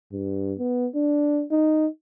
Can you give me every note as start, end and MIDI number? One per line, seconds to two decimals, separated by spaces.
0.12 0.54 43
0.59 0.87 59
0.95 1.44 62
1.51 1.87 63